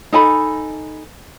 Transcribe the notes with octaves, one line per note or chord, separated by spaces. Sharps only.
D#4 A4 G#5 B5